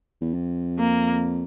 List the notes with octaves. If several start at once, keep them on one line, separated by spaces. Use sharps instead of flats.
E2
F2
A#3